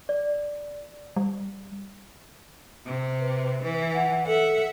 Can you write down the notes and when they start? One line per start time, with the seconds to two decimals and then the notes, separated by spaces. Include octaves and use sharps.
0.09 D5
1.16 G3
2.86 C3
3.20 B4
3.64 E3
3.95 F#5
4.27 A4 E5 F#5